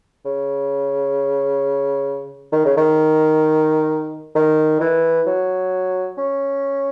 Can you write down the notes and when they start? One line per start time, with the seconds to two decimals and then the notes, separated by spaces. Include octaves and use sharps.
0.25 C#3
2.52 D#3
2.65 C#3
2.77 D#3
4.35 D#3
4.81 E3
5.27 F#3
6.18 C#4